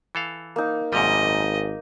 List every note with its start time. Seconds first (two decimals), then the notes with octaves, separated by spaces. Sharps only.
0.15 E3 A4 F5
0.56 A#3 D#4
0.93 G#1 F#2 A#2 G3 D#5